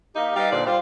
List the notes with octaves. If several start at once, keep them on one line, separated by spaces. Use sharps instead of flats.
A#3 D#4 G4
G3 D#4 B4 D#5 F5
A#2 D3 C5 D5
G3 F4 C5 F5